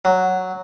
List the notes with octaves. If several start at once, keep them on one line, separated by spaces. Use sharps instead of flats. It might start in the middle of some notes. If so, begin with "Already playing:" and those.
F#3